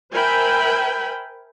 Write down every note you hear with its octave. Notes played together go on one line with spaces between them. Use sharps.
A#4 C5 E5 G5 G#5 B5